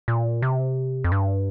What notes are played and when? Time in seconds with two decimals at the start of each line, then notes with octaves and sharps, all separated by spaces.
0.08 A#2
0.42 C3
1.04 F2
1.12 G2